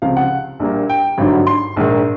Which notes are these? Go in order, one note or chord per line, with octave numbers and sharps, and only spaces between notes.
C#2 C3 F3 F5
F#5
A#1 A#2 G3 A#3
G5
G#1 G2 D3 F#3
C6
A#1 G#2 D#3